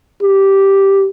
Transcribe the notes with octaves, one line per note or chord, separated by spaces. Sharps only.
G4